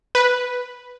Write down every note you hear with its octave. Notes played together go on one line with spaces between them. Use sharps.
B4